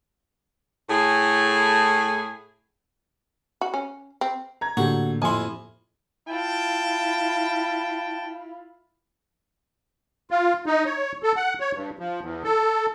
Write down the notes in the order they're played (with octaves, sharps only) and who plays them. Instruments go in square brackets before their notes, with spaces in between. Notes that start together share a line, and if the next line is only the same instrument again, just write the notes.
[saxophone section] A2 G#4
[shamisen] F#4
C#4
C4
[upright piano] A#5 G#6
[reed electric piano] A2 [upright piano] D3 [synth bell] A#3 G4 [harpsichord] F#4
[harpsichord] F2 E4 [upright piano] G#5 C6
[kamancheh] E4 F4 [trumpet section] G5 A5
[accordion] F4
D#4
C#5
A4
F#5
C#5
G2
F3
E2
A4